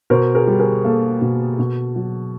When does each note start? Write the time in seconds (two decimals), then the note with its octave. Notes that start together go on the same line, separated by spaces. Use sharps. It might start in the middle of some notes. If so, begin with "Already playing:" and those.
0.10 B2 A#4 C5
0.35 G#4 A#4
0.47 G3
0.59 G#4 A#4
0.84 A#3 A4
1.21 B2
1.59 B2
1.96 F#3